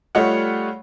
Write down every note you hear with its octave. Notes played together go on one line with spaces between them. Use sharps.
G3 A3 F4 C#5 D#5 F#5